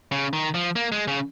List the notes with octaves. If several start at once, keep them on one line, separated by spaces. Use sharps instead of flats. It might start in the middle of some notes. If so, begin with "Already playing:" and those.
C#3
D#3
F3
A#3
G#3
C#3